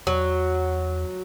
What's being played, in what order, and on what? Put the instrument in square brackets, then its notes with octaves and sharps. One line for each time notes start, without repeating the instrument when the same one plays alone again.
[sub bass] E2 [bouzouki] F#3